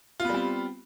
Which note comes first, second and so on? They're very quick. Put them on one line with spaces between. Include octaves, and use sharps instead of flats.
F4 B3 G3 C4